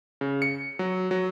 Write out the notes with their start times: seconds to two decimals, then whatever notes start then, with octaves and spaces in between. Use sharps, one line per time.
0.21 C#3
0.42 C#7
0.79 F#3
1.11 F#3